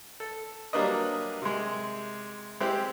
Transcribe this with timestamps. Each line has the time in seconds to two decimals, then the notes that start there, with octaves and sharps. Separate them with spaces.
0.20 A4
0.73 F#3 G3 A#3 D4 B4 D#5
1.42 C3 G#3
2.60 G#3 C4 E4 G4